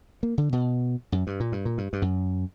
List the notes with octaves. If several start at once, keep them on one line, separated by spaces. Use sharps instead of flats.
A#3
D3
B2
F#2
G2
A#2
G2
A#2
G2
G2
F#2